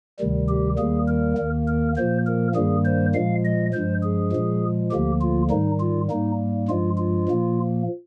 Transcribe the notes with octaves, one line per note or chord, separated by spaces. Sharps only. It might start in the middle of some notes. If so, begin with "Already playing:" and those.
D2 C3 D#3 G3
G4
D#2 D#3 G3 A#3 G#4
A#4
D#2 D#3 A#3
A#4
A#2 F3 A#3 C5
A#4
G2 D#3 G3 A#3 G#4
C5
A#2 F3 G#3 F5
D#5
G2 F3 G#3 C5
G#4
A#2 F3 G#3
D2 D3 F3 A#3 G4
F4
G#2 D#3 G3 D#4
F4
G#2 G3 A#3 D#4
G2 F3 G#3 F4
F4
A#2 F3 A#3